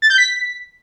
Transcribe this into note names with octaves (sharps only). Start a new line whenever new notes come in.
A6
G6
B6